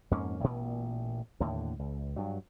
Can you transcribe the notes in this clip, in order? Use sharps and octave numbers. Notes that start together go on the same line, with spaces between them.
F2 G#2 A#3 C#4
A1 A#2
D#2 A2 D3
C#2
G2 F#3